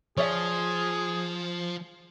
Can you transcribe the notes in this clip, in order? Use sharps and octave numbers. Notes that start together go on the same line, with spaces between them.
F3 G#4 C#5 D5 E5